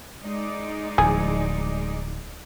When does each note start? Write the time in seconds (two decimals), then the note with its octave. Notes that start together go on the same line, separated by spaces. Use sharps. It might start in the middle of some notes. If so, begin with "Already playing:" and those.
0.23 G#3 D#4 D5
0.98 D1 F3 G#4